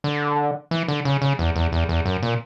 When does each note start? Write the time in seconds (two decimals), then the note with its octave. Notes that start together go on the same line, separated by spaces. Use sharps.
0.04 D3
0.71 E3
0.88 D3
1.05 C#3
1.22 C#3
1.39 E2
1.56 E2
1.72 E2
1.89 E2
2.05 F#2
2.23 A#2